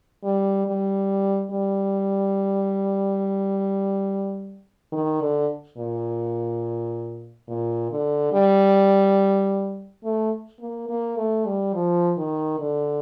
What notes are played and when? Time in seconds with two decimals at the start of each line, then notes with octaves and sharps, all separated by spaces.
0.24 G3
0.67 G3
1.51 G3
4.92 D#3
5.21 D3
5.77 A#2
7.48 A#2
7.91 D3
8.33 G3
10.04 A3
10.60 A#3
10.89 A#3
11.17 A3
11.46 G3
11.74 F3
12.17 D#3
12.59 D3